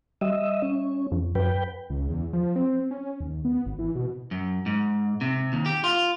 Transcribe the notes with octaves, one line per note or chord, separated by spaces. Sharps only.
G3 D#5 E5
C#4
F2
F#2 B4 G5
C#2
E2
F3
C4
C#4
D#2
B3
G#1
E3
B2
F#2
G#2
C3
D#2
G4
F4